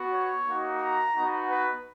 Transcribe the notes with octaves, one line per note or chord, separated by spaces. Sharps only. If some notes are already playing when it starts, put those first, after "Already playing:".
Already playing: B3 F#4
C#5
A#3 D#4 F#4
A#5
B3 D#4 F#4
B4